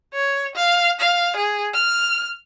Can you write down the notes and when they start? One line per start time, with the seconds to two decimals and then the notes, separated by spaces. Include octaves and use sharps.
0.14 C#5
0.55 F5
1.00 F5
1.36 G#4
1.74 F6